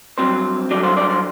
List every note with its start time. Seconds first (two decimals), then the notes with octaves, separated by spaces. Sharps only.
0.18 G2 F#3 C4 C5
0.71 G2 D3 F#3 D5
0.83 C5
0.97 D5
1.10 C5